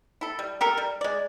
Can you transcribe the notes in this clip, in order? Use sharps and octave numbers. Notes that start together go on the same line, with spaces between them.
E4 A4
G3
G4 A4 A#4
G3
G#3 D5